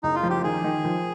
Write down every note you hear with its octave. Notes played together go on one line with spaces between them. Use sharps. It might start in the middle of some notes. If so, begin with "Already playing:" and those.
F#1 D#4
F4
F3
G4
D#3 G#4
D#3
F3